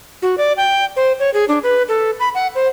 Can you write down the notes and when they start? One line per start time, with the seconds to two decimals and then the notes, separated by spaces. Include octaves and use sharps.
0.22 F#4
0.38 D5
0.57 G5
0.96 C5
1.20 C#5
1.34 G#4
1.49 D4
1.63 B4
1.89 A4
2.20 B5
2.35 F#5
2.55 C5